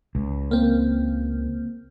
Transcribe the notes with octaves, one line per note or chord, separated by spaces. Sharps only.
C#2
A#3 C4